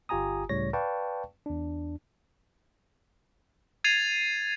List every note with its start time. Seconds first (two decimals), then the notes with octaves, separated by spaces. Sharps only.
0.09 G1 F4 G4 G#5 A#5 D#6
0.49 C#2 A2 C#3 G3 C#5 A#6
0.73 B4 D5 F5 G5 A5 C#6
1.46 E2 D4
3.84 G#6 A6 C7 D#7 F7